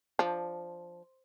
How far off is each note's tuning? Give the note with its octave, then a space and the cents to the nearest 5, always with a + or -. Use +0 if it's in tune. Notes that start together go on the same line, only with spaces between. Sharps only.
F3 +0 D4 +0